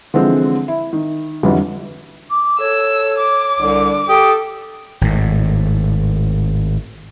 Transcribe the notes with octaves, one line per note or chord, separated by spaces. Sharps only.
D3 E3 F3 G#3 C4
E4
D#3
F2 D3 E3 F#3 G3
D6
A4 C#5 E6
D6
C2 D3
G4 A4 D#6
G#1 A2